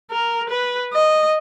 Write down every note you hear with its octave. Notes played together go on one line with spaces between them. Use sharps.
A#4
B4
D#5